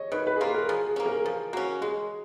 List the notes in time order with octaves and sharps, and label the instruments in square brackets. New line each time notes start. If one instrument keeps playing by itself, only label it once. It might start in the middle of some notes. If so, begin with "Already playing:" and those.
Already playing: [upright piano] C#5 D#5
[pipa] D#3 [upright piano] B4
[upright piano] B4
G#4
[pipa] A#3 F4 [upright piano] A#4
[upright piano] A#4
[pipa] F3 [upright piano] G#4
[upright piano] G#4
[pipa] A#3 C#4
[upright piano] A#4
[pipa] F3 [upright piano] G#4
[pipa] A#3 C#4 [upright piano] F#4
[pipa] G#3 [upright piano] G#4